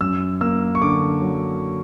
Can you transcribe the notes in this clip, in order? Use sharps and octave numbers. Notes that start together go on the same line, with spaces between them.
F#2 E6
A#3 E6
C#6
D3 D6
F#3